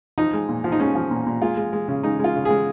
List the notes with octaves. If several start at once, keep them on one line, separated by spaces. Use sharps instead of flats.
F3 D#4
G#3
A#2
F3
D#4
G#3 C#4
F3
A#2
A#2
G#3 F4
G#3
G#3
C#3
G#3 D#4
G#3 F4
C#3
G#3 G#4